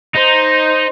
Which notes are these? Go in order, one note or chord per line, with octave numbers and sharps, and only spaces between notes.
D#4 C5